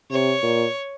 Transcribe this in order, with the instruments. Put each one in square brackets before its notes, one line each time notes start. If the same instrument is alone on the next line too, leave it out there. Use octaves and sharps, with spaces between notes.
[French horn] C3 [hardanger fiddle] C#5
[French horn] A#2